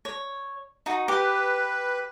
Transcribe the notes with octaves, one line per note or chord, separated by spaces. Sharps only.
C#5
D#4 F#4
G4 B4